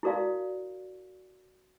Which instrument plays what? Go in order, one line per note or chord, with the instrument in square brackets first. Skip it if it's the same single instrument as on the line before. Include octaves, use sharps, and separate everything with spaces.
[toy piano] E4 F#4 A#4 D5 F5